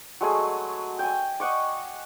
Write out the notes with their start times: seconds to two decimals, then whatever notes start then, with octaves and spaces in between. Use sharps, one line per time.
0.21 F#3 G#3 A3 G#4
0.99 G5 G#5
1.40 D#5 F#5 C#6 D6